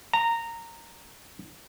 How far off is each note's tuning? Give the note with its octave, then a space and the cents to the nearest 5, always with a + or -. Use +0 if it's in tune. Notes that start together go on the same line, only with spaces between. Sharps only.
A#5 -15